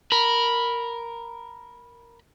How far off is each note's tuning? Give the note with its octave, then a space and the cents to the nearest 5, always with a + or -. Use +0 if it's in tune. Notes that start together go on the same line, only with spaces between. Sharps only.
A#4 +0 B5 -10